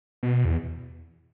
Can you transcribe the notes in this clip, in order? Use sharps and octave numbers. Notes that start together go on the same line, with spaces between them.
B2
E2